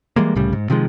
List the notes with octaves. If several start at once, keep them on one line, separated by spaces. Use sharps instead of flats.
E3 G3 G#3 A#3
C2 A2 C#3 G3
G#2
C3 D#3 F3 G#3